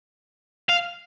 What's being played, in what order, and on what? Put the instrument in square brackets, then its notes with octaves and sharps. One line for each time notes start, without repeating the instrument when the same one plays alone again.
[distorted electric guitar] F5